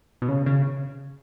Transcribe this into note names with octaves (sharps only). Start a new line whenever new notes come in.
B2
C#3
C#3